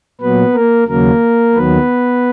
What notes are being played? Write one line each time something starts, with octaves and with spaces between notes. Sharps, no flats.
A#2 F#3 B3 B4
A#3 A#4
D#2 C#3 F#3 A#3 A#4
D#2 D#3 F#3 B3 B4